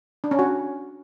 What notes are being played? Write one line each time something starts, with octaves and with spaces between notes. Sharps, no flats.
D4
C#4
F#4